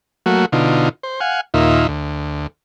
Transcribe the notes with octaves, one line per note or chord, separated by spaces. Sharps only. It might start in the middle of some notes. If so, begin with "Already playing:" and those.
F#3 A3 A#3 F#4
B2 D3 D#4 F4
C5
F5 F#5 G#5
D#2 A#2 D#4 F4 E5
D2